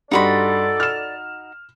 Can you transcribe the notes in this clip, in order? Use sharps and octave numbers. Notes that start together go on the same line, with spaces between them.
G2 G3 D#4 F#4 A4 D5 B5 C6
F6 E7